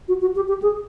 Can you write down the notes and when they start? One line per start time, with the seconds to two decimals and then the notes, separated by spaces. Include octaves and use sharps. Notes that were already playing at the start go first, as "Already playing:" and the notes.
0.08 F#4
0.22 F#4
0.36 G4
0.48 G4
0.62 G#4